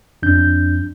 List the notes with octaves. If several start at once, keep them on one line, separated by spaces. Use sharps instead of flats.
F2 D4 G6